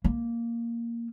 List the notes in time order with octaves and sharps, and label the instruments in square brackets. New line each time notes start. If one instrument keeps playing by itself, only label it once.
[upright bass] A#3